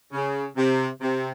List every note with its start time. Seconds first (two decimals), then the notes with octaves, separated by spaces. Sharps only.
0.12 C#3
0.56 C3
1.01 C3